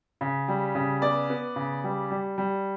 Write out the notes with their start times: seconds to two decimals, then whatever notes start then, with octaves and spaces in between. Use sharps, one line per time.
0.21 C#3
0.48 G3
0.75 C#3
1.02 B3 D5
1.30 B3
1.56 C#3
1.84 G3
2.10 G3
2.38 G3